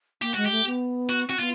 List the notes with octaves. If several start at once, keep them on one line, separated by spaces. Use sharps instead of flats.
A#3 G4
G#3 F#4
G4
A3
B3
F#4
C4 F#4
B3 F4